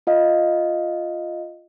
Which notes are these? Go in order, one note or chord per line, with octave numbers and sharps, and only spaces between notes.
F4 D#5 F5